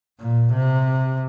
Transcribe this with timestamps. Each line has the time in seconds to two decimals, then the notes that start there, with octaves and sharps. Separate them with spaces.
0.20 A#2
0.53 C3